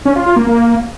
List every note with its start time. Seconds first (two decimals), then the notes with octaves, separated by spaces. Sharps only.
0.05 C#4
0.16 F4
0.26 F4
0.36 A#3
0.47 A#3